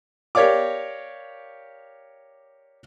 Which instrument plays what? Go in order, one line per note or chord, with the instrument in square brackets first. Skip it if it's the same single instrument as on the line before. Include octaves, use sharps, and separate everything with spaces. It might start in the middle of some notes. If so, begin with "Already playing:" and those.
[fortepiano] G4 A#4 C#5 D5 F5 D6